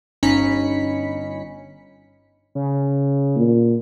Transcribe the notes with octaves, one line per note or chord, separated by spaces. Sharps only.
G1 C#4 D#4 B5 B6 C#7
C#3
A#2